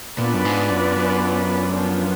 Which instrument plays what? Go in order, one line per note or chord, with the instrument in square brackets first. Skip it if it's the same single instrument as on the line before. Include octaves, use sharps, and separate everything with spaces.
[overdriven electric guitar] A#2 [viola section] B3 D4 F4 B4 D5
[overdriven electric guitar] F#2
G#2
F#2
F#2
[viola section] F3 B3 D4 F4